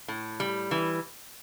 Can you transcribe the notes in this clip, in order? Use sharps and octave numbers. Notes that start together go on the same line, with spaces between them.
A2
G3
E3